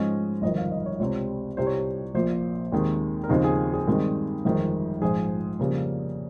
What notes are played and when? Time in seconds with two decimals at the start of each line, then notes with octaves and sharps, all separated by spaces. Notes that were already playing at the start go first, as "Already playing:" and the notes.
Already playing: G#2 F3 G#3 C#4 D#5
0.42 G1 F2 D#3 D#5
0.57 F5
0.71 D#5
0.86 C#5
1.00 C#2 C3 G3 C4 C#5
1.57 C2 C3 G3 C5
1.67 C#5
1.75 C5
2.15 A#1 A#2 F3 C5
2.72 D#2 D#3 G#3 C4
3.24 A#4
3.29 D#2 C#3 F3 C4 D#4 C5
3.44 G#4
3.73 G#4
3.87 G2 D#3 G#3 C4 D#4 G#4
4.45 G1 F2 D#3 G#3
5.02 A#1 G#2 F3 G#4
5.60 F2 C#3 G3 A#3